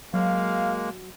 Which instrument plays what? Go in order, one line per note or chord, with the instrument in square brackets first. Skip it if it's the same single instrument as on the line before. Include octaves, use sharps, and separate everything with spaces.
[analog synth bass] F#3 [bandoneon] G#3 A#3 [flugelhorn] F5